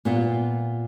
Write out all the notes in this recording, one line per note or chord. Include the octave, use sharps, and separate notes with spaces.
A#2 B3 F4